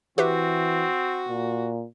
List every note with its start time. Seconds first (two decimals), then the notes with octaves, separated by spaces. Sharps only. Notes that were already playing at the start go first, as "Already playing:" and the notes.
0.18 E3 C4 F#4 G4 B4 E5
1.28 A#2